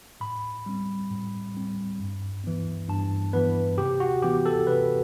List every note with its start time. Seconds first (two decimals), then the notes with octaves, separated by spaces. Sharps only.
0.20 A2 B5
0.66 G3 C4
1.11 A2
1.55 G3 C4
1.99 G2
2.44 E3 B3
2.88 G2 A5
3.33 E3 B3 B4
3.78 C3 G4
4.00 F#4
4.23 E3 B3 G4
4.46 A4
4.67 C3 B4